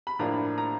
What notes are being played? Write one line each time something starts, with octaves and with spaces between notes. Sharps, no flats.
B5
A2 F3 A#3 D4 F4 A#5
A#5